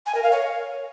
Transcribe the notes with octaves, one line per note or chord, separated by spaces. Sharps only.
G#5
A#4
F5
C#5